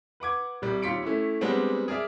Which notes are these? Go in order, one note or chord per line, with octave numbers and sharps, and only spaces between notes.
B4 F#5 D6 G#6
C2 G3
D#2 F4 C6 B6 C#7 D7
A3 C#4 E4
G3 G#3 B3 C4 D4
G#4 A#4 D5 E5